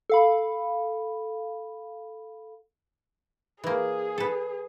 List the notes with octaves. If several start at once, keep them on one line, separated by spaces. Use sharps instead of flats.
A4 F5 B5
E3 A#3 G#4
A4 B4